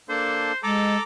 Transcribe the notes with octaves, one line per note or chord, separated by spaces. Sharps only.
A#3 D4 A4 C5
G#3 A4 A#5 D6